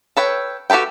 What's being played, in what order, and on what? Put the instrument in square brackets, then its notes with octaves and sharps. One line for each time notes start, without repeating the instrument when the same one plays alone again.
[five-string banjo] A4 B4 C#5 G5
F#4 G4 A4 B4 G5